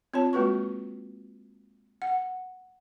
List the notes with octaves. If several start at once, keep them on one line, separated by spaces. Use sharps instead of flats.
C4 F4 C#5 A5
G#3 A#3 F#4 B4 C#6
F#5